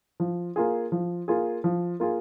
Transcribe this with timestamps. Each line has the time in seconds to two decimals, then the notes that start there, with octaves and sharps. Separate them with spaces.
0.20 F3
0.56 A#3 F4 G#4
0.92 F3
1.28 A#3 F4 G#4
1.64 F3
2.00 A#3 F4 G#4